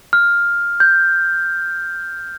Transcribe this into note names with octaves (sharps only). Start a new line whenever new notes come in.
F6
G6